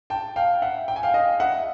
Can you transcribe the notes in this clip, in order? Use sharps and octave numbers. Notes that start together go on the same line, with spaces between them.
G5 A5
F5 G5
E5 F#5
G5
G#5
F5 G5
D#5 F5
E5 F#5